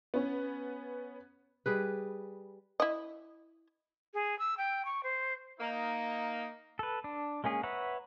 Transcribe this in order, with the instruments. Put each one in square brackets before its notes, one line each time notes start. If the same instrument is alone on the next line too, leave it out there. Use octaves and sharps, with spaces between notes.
[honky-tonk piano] B3 C#4
[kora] G3 G#4 B4
[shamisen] E4 D#5
[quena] G#4
E6
G5
C#6
C5
[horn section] A#3 D#4
[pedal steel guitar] A4 B4
D4
G#3 A#3 C#4 G#4
B4 C#5 E5 F#5 A#5